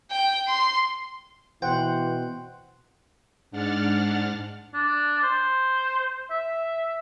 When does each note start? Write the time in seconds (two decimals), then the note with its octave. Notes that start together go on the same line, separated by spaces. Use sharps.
0.11 G5
0.48 C6
1.62 B2 E3 C5 F#5 G5
3.51 G#2 D4 F#5 F6 A6
4.74 D4
5.23 C5
6.30 E5